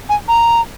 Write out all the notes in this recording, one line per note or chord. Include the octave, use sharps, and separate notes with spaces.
G#5
A#5